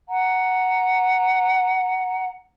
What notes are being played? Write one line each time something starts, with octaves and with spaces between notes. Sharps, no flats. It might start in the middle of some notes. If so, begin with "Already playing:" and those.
F#5 A#5